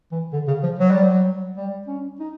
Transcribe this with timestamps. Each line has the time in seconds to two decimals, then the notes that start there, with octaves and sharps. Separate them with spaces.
0.12 E3
0.33 D3
0.48 C#3
0.63 F3
0.80 F#3
0.91 G3
1.03 F#3
1.57 G3
1.88 C#4
2.20 D#4